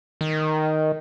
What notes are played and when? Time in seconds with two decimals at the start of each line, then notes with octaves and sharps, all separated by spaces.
0.21 D#3